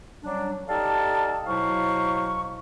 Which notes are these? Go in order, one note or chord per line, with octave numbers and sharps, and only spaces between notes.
F#3 G3 C#4 D4
D#4 G4 A4 D5 F5 A5
B2 F#3 E4 C5 F5 C#6